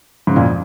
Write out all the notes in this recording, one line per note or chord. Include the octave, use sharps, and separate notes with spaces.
G#2 C#3
F2 A#2